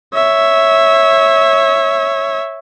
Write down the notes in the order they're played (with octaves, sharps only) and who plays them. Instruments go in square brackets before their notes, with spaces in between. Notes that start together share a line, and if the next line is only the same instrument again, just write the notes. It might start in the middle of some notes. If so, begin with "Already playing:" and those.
[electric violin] C#5 E5